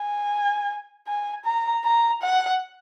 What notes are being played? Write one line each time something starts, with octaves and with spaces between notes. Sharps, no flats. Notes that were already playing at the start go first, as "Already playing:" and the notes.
Already playing: G#5
G#5
A#5
A#5
F#5